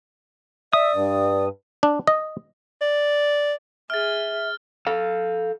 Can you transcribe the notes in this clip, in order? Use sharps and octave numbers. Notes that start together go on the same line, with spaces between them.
D5 E5 D#6
G2
D4
D#5
D5
G#4 E5 F6 A6
A4 F5